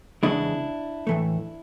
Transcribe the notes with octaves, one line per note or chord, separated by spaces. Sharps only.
E2 C#3 E3 G#3 D4 E4
A2 E3 A3